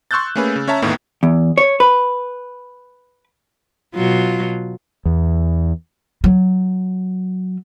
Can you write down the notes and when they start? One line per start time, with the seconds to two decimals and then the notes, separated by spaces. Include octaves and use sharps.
0.11 C6 C#6 E6 F#6 G6 A6
0.36 A3 A#3 C#4 G#4 B4
0.56 C#3
0.68 C#4 C#5 E5 A5 A#5
0.82 G#1 E2 A2 D#3 A#3 B3
1.23 E2
1.58 C#5
1.80 B4
3.95 B2 F#3 F4
5.05 E2
6.24 F#3